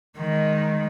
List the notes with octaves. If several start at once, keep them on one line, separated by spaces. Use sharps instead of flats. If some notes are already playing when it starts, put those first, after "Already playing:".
D#3 G#3